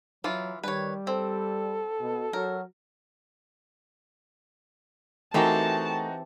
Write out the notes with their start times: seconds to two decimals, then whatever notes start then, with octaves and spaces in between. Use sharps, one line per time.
0.24 E3 F#3 F4
0.64 D#3 G3 B4 C#5
1.07 C4 A4
2.01 B2
2.33 F#3 A#4
5.34 E3 A3 C4 D#4 F#4 G4 A#4 A5